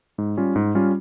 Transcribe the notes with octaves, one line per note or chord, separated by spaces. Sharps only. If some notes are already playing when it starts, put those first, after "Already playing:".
G#2
G3 C#4 F4
G#2
G3 C#4 F4